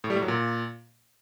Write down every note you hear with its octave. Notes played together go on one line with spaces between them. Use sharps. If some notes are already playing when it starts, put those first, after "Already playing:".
A2
G3
A2
F#3
A#2